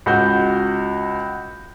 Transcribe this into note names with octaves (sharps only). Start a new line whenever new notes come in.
C#2 F#4 G6